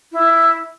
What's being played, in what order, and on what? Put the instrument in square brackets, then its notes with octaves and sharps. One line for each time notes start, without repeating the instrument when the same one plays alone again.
[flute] E4